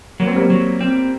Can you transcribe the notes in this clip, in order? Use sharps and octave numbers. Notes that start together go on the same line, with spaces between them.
F#3 A#3
C4
G3 A#3
F#3
C4